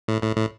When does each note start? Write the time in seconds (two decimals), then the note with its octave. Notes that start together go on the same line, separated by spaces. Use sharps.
0.08 A2
0.22 A2
0.36 A2